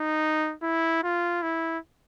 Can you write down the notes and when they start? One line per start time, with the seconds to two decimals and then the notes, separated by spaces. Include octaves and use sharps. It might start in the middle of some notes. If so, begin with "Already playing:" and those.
Already playing: D#4
0.62 E4
1.03 F4
1.42 E4